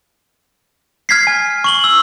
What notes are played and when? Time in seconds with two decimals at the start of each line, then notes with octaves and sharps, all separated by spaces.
1.09 F6 G#6 B6 C7
1.27 G#5
1.64 C#6 F#7 G7
1.84 E6